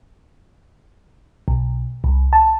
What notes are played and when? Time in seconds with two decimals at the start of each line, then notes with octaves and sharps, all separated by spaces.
1.48 B1
2.04 C2
2.33 A5